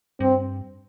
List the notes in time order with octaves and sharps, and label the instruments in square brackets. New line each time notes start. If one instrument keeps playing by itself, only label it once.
[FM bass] G2 [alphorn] C4